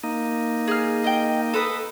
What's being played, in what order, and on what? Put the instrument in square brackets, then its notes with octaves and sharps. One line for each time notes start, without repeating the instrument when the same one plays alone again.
[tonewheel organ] A#3 D#4
[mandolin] G#4 F6
D#5 G5
A4 B4 D#6